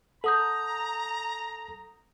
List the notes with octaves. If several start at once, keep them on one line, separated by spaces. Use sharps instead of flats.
A4 F#5 A#5 D#6 G6